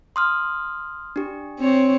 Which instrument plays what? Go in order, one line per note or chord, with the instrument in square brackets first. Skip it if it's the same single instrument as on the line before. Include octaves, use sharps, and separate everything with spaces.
[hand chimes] C6 D#6 F6
D4 G4
[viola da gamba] C4 C#5